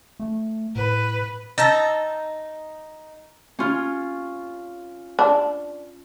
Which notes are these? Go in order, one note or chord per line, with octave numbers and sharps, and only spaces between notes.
A3
A2 B4
D#4 A5 E6 A#6
C#4 F4
D4